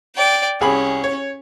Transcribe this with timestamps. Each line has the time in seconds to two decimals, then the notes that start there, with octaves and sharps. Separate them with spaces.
0.16 D5 G5
0.61 C2 C#4 G#4 B5
1.04 C#5